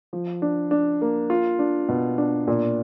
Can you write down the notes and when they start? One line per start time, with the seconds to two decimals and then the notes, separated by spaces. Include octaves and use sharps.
0.13 F3
0.42 D4
0.71 D4
1.02 A#3
1.30 F4
1.59 D4
1.89 B2
2.18 D4
2.47 A#2